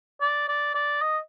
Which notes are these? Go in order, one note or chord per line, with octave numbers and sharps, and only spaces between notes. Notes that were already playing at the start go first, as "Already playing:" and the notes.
D5
D5
D5
D#5